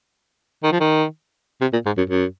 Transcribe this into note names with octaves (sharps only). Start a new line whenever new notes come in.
D#3
F3
D#3
C3
A#2
G#2
F#2
F#2